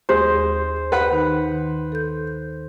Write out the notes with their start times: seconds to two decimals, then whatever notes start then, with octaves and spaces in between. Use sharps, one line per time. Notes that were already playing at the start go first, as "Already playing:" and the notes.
0.09 D#2 G#3 C5
0.92 B4 F#5 B5
1.12 D#3 D#4
1.52 D#3
1.92 A4 G6